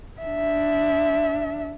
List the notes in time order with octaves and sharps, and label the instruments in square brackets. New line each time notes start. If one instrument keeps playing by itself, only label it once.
[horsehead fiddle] D4 E5